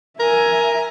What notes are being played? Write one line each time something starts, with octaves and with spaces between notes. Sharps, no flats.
A#4 E5 G#5